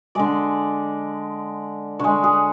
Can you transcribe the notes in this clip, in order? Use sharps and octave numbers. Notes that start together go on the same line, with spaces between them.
D3 G#3 D5
D3 G#3 C#5
G#4